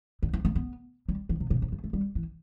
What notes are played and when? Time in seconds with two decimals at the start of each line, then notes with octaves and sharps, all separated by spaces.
0.23 D3
0.33 E3
0.45 A3
0.55 B3
1.09 G3
1.29 E3
1.40 C3
1.50 C3
1.62 C3
1.72 A3
1.84 A3
1.93 G3
2.15 E3